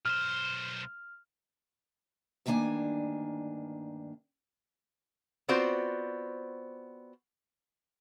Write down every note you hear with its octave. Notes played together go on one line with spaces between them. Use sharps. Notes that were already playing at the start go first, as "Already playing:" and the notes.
B1 C5 F6
D2 G2 D#3 A#3 D4 G#5
B3 C4 F4 F#4 C5 D5